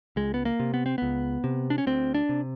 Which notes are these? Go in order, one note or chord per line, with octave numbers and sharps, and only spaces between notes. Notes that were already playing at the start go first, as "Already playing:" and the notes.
C#2 G#3
B3
A#3
C3
B3
C4
C#2 B3
C3
D4
C#4
D2 C4
D4
C3